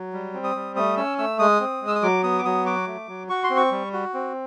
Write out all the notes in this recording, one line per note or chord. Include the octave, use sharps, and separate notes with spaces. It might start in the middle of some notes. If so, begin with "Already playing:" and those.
Already playing: F#3
G3
C4
D#6
G3
A3 D#6
C#4 E6
A3 E6
G#3 D#6
C4
G#3
E6
D#6
F#3 D6
B3 D#6
D6
F#3 D#6
F#4 D6
A3
F#3
F#4 C#6
C6
C4
C#6
G3
F#4
C4